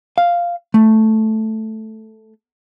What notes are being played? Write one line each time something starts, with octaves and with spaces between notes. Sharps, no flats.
F5
A3